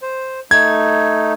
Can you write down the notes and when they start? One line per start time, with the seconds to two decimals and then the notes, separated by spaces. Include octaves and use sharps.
0.02 C5
0.51 A3 D#4 G#6